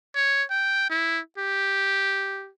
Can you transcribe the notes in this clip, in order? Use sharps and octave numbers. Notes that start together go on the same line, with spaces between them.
C#5
G5
E4
G4